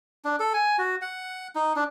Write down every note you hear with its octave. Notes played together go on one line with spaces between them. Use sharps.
D4
A4
G#5
F#4
F#5
D#4
D4